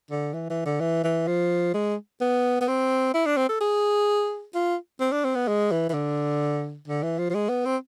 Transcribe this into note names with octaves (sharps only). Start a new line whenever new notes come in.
D3
E3
E3
D3
E3
E3
F3
G#3
B3
B3
C4
E4
D4
C4
A4
G#4
F4
C4
D4
C4
B3
G#3
E3
E3
D3
D3
E3
F3
F3
G#3
B3
C4